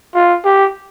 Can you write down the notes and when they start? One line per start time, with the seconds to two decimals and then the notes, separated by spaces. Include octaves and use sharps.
0.14 F4
0.45 G4